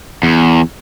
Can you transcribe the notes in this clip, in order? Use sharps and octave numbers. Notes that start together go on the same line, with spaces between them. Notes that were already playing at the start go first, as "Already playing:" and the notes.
E2